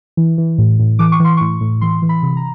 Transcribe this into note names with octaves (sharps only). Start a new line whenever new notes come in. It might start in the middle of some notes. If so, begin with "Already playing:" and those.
E3
E3
A2
A2
E3 D6
C#6
E3 C6
A2 C#6
A2
E3 C6
E3
B5
C3
A#5